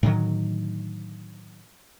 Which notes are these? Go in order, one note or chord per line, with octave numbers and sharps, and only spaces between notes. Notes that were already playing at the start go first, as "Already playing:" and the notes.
A2 D3 D#3 F#3